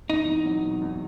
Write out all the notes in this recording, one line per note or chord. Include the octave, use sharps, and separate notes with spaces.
E2 D#4
E2
F#3
B2
E2